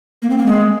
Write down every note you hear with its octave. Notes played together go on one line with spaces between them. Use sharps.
A#3
C4
A#3
G#3